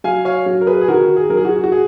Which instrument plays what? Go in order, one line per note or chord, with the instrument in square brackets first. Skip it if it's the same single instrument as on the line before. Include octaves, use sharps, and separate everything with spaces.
[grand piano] F#3 F5 G#5
C#5 F5
F#3
A#4
G#4 B4
G#4
D#3 F#4 A#4
G#4
F#3 A#4
G#4
F#4
F#4
G#4